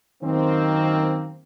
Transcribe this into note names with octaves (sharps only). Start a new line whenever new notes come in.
F#2 D#3 A#3 C4